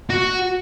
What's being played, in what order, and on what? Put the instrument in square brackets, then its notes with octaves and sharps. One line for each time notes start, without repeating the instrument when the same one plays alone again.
[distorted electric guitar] F#4